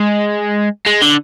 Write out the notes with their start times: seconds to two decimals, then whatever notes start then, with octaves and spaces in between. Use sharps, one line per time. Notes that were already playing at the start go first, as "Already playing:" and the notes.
Already playing: G#3
0.87 G#3
1.02 D3